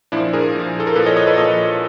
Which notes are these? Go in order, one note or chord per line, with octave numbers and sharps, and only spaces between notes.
A#2 F3 D4 E4
G#4 A#4
A#2 F3
A4
A#4
A#2 F3 A4 B4
C#5 D#5
C#5 D#5
A4 B4
A#2 F3 C#5 D#5